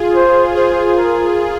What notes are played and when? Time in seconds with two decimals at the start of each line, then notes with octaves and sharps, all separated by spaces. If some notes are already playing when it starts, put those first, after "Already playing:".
Already playing: F4 G#4
0.15 C5
0.56 F4 G#4 C5
0.97 A#4